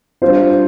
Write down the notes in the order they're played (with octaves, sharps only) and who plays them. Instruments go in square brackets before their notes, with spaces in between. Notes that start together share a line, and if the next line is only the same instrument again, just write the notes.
[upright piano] G3 D4 F4 C5